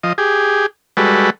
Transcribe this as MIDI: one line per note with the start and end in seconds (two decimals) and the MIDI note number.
0.03 0.13 53
0.03 0.13 75
0.18 0.66 67
0.18 0.66 68
0.97 1.30 55
0.97 1.30 56
0.97 1.30 66
0.97 1.30 69
0.97 1.30 71